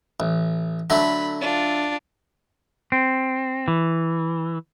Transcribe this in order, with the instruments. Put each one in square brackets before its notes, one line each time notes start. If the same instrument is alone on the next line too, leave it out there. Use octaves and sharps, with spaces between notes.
[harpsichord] A1
[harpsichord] D3 F#3 A3 [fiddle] B5
[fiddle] D4 F4
[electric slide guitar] C4
E3